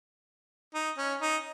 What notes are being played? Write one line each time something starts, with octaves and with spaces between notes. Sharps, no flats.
D#4
C#4
D#4